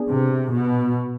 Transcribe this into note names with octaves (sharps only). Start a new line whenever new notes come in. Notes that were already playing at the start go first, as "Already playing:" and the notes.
Already playing: B3 D4 G#4
C3
B2